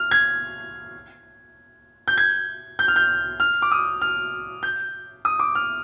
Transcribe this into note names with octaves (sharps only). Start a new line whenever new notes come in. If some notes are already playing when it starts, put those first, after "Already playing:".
Already playing: F6
G#6
G6
G#6
G6
F6
G6
F6
D6
D#6
F6
G6
D#6
D6
F6